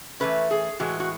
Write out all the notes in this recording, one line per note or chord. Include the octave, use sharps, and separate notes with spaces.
E3 A3 C#4 B4
G#4
A2 E3 G#3 F#4
F#4